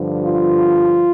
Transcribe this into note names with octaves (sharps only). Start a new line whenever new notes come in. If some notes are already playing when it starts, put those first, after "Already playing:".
Already playing: G2 D3 F3
F4